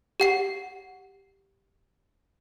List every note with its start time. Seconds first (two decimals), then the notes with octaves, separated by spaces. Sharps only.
0.20 G4 F#5 C7